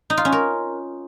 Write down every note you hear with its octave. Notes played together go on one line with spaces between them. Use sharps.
D#4
F4
C#4
A#4